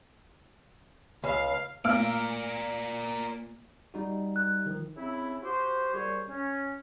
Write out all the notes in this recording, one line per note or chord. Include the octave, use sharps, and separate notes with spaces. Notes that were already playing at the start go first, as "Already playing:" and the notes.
C#2 F5
A#2 A3 A#4 D5 F5 F6
G3 D#4 F#4
F#6
D#3 F3
C#3 C4 E4
F#4 G4 C5
D#2 G3 G#4 C5 C#5
C#4